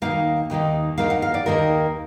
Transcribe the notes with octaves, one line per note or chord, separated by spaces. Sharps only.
D#2 D#3 A#3 D#4 F5
D#2 D#3 A#3 D#4
D#2 D#3 A#3 D#4 F5
F#5
F5
D5
D#2 D#3 A#3 D#4 A#4